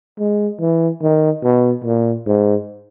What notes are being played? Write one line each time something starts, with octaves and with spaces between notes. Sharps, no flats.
G#3
E3
D#3
B2
A#2
G#2